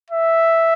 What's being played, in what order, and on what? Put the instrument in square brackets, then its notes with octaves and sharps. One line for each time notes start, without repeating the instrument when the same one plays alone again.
[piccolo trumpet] E5